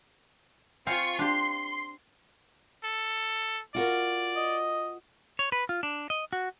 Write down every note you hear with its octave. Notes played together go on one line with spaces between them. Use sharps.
C4 F4 F5 G#5 C#6
D4 G4 C6
A4
F4 F#4 A#4 D5
D#5
C#5
B4
F4
D4
D#5
F#4